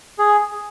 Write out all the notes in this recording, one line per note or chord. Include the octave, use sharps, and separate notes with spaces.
G#4